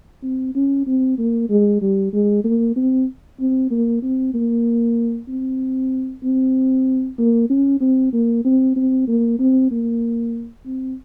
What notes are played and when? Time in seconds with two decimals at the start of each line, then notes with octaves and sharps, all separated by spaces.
0.23 C4
0.55 C#4
0.86 C4
1.18 A#3
1.50 G#3
1.81 G3
2.13 G#3
2.44 A#3
2.76 C4
3.40 C4
3.71 A#3
4.02 C4
4.34 A#3
5.28 C4
6.23 C4
7.18 A#3
7.50 C#4
7.81 C4
8.13 A#3
8.44 C4
8.76 C4
9.08 A#3
9.39 C4
9.71 A#3
10.65 C4